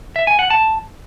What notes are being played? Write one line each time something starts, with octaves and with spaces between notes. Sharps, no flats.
E5
G#5
F#5
A5